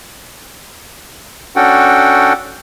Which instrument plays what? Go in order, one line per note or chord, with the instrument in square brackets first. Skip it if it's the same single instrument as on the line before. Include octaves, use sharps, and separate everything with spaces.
[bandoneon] C#4 D4 F#4 A4 F#5 G5